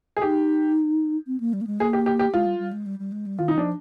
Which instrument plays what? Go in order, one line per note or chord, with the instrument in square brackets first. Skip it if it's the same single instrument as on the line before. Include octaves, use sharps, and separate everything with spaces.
[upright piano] G#4
[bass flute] D#4 [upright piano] G4
[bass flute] C4
A#3
G3
A#3
G#3
[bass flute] A#3 [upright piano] G#4
[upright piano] G4
G4
G4
[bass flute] G#3 [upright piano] F4
[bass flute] G3
G3
G#3
G3
G3
G#3
G3
[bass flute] D#3 [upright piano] F4
[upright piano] D#4
[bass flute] F3 [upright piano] D4